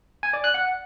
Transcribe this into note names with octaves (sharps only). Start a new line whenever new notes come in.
G#5
D5
F#6
F#5